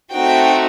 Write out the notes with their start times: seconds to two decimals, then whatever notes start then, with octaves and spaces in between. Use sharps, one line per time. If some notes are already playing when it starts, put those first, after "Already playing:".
0.14 A3 C4 D#4 F#4 G5